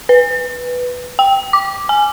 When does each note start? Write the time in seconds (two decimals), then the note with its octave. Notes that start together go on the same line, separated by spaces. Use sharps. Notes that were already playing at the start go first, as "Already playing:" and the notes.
0.09 B4
1.19 G5
1.53 D6
1.89 G#5